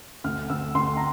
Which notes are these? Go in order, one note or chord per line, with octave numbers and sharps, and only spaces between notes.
D2 F6
D2 E6
D2 C6
A#5